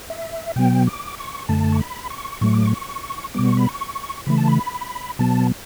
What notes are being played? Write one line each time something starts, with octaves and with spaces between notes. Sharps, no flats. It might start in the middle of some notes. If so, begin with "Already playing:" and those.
E5
B2 F#3 B3 G5
D6
C#6
F#2 D3 A3 A5
C#6
B5
C#6
A2 F#3 A3 C#6
D6
C#6
B2 G3 B3 D6
C#6
B5
C#6
C#3 E3 A3 B5
A5
B5
B2 F#3 B3 A5